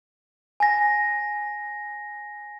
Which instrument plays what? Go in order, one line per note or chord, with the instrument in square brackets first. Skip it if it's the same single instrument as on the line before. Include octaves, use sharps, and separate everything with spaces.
[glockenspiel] G#5 A#6